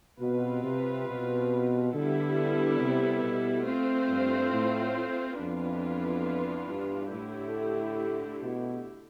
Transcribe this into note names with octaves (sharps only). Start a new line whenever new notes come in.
B2 G3 C4 F4 B4
C3
B2
D3 G3 B3 E4 A4
C3
B2
A3 C4 F4 C5
G2
A2
F2 E3 B3 D4 F4 B4
G2
A2 D3 A3 E4 G4
B2